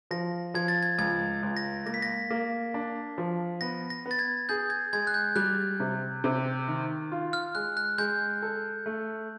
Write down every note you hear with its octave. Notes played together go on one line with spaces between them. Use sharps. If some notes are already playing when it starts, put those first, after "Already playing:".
F3 A#6
F3 G#6
A6
G#6
C#2 G#6
C#2
A#6
A#3 A#6
B6
A#6
A#3
D4
F3
B3 A#6
A#6
B3
A6
G#6
G#4 G6
G#6
G#3 G#6
F#6
G6
G3 F#6
C3
C3
D#3
F4
F6
G#3 F#6
F#6
G#3 G6
A4
A3